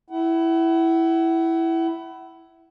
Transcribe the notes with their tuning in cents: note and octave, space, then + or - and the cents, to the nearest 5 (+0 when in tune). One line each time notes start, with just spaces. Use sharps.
E4 +0 F#5 +35